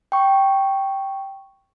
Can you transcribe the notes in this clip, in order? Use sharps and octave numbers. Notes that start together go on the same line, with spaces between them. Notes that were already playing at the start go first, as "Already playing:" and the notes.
G5 C#6